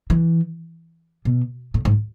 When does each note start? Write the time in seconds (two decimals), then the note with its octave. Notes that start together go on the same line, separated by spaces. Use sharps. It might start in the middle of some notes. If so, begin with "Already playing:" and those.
0.10 E3
1.25 B2
1.74 A2
1.85 G#2